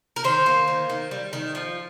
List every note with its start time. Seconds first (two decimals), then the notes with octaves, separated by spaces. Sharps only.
0.16 A#4
0.24 D#3 C5
0.46 A#3
0.68 D#3
0.90 D#3
1.11 G3
1.33 D#3
1.55 F3